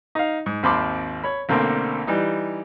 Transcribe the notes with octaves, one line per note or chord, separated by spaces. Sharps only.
D#4 F5
G#2
G#1 D#2 C4 B5 C6 D6
C#5 B5
B1 D3 A3 A#3 C4 A4
E3 G3 D#4